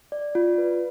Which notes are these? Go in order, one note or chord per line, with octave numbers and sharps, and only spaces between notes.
D5
F4
B4